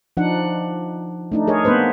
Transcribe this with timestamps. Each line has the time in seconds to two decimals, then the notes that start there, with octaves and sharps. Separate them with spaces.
0.17 F3 D4 D#4 F#5
1.32 A3 D4 D#4
1.47 G#4 A#4 C#5 D#5
1.65 A#3 B3 D4 B4 C5